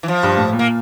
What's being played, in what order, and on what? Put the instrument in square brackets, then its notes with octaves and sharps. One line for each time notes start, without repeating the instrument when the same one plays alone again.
[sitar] E3
F3
[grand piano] G2
A2
A#2
[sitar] A#3